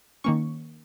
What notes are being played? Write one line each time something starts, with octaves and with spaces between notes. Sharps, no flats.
D#3 A#3 C#4 C#6